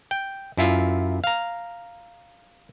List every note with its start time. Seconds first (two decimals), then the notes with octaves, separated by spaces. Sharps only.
0.11 G5
0.57 F#2 E4 F4
1.24 F5 A#5